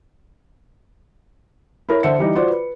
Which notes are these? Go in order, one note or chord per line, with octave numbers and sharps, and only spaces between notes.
E4 A#4 C#5
D3 C5 E5 C#7
E3 G3 D#4
F4 F#4 C5 D5
B4